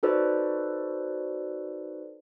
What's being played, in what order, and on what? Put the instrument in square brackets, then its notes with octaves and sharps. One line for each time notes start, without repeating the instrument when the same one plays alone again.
[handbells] D#4 F#4 A4 B4 C5 D5